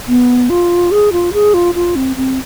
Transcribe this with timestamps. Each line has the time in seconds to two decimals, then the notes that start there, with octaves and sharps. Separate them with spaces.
0.08 B3
0.50 F4
0.91 G#4
1.13 F4
1.33 G#4
1.54 F4
1.75 F4
1.96 C4
2.17 C4